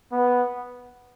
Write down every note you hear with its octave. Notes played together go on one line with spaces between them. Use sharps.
B3